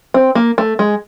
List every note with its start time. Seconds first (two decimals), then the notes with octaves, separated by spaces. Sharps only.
0.14 C4
0.35 A#3
0.58 A3
0.79 G#3